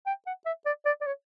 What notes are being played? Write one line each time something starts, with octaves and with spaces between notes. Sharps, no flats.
G5
F#5
E5
D5
D5
D5
C#5